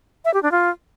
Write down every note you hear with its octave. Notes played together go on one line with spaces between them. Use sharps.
E5
G4
D4
F4